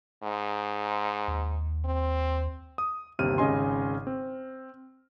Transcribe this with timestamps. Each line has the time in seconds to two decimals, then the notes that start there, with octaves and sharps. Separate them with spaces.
0.23 G#2
1.28 D#2
1.85 C4
2.78 D#6
3.19 G1 D#2 C3 F6 D#7
3.38 G#1 C#3 C#4 D#5 G#5 C6
4.07 C4